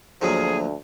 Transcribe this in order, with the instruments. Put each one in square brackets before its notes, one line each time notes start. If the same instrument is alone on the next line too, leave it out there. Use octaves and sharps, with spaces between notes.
[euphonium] D2 [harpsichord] F3 F#3 A#3 [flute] G#4